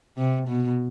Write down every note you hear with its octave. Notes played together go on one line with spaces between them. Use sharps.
C3
B2